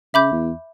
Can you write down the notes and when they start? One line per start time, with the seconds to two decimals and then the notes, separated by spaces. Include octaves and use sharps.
0.14 C#3 E5 B5 D6 G6
0.32 E2